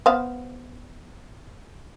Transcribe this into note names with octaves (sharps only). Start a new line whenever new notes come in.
B3 C5 F5